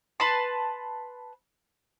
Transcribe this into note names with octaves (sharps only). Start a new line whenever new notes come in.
B4 A5 C6